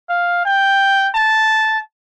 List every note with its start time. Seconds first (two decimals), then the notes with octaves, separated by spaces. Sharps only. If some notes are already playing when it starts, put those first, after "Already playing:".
0.09 F5
0.45 G5
1.15 A5